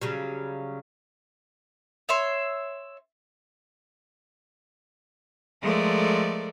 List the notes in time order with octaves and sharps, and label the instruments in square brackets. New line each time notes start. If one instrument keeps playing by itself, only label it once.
[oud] C#3 F#3 G3
[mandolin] C#5 E5 C6
[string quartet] F3 G#3 A3 A4 A#4 D5